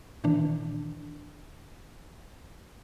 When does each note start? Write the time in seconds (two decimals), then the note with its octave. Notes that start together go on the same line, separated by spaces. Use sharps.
0.24 A#2 D#3 E3 D4